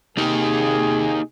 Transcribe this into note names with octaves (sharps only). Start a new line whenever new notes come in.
C3 A#3 D#4 G4 G#4